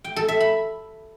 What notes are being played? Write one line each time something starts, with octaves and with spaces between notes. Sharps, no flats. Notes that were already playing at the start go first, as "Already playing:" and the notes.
G5
A4
E5
B5